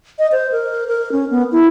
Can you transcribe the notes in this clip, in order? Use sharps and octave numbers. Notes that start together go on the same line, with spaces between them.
D#5
C5
A#4
A#4
C#4
B3
E4